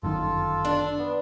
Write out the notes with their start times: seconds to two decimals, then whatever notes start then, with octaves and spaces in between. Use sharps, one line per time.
0.03 G1 F#2 D#3 F4 A4
0.65 D4
0.98 B3